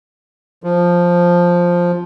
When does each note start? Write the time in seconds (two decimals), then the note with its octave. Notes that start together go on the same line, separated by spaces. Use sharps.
0.64 F3